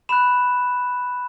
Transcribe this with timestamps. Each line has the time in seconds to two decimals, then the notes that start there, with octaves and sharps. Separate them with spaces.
0.09 B5 F#6 E7